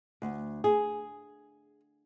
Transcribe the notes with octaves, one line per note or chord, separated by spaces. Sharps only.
D2
G#4